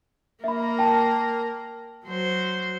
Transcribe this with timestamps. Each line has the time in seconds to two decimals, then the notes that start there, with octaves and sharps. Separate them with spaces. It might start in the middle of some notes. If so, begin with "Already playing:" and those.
0.44 A#3 A#4 E5 B5
0.79 G5 A5
2.06 F#3 C5